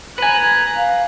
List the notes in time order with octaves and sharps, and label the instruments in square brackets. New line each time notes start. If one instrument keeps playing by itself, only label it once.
[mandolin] B4 G#5 [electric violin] A#5 F#6
[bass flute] F5